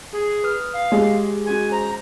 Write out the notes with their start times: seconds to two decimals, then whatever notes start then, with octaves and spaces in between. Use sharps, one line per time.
0.13 G#4
0.43 B4 D#6 F6
0.74 F5
0.92 G#3 G4 C#5
1.46 C#4 F#4 G#4 G#5
1.72 C5 A#5